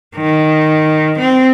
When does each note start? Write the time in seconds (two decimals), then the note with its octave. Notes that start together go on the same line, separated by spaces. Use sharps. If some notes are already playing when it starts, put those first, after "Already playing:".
0.17 D#3
1.19 C4